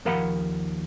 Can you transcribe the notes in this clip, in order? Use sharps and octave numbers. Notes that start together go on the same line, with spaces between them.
D#2 F3 A#4 F5 F#5 B5